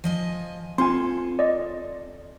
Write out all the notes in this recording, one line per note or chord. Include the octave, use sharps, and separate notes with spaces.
F3 D#5 G#5
C4 F4 A4 G#5 C6
D5 D#5